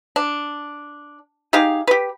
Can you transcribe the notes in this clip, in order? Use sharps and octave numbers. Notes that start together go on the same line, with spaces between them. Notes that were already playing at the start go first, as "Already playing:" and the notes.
D4
D#4 G4 G#4 F5
G4 B4